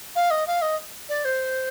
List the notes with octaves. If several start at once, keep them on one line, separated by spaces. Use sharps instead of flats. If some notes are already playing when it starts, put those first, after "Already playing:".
F5
D#5
F5
D#5
D5
C5